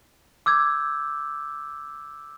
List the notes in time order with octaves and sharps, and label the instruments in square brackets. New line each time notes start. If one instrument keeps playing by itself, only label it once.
[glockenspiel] D6 E6 G6 G#6